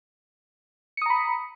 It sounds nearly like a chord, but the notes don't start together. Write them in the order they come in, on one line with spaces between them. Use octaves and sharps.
C#7 D#6 A#5 B5